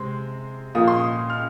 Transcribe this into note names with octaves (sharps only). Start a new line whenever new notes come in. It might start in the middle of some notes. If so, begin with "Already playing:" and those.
Already playing: C3 G#3 C4 C6
A#2 F3 A#3 D#6
C6
D#6
F6